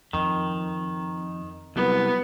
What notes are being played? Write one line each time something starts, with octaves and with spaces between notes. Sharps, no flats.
F2 D#3
C2 F#3 B3